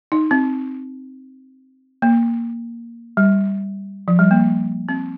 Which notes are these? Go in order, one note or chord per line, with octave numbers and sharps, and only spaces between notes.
D#4
C4
A#3
G3
F3
G3
A#3
C4